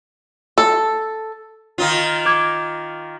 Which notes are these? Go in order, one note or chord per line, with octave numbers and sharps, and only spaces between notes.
A4
D#3 D#4 F4
D6 G#6